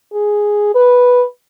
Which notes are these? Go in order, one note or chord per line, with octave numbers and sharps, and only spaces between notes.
G#4
B4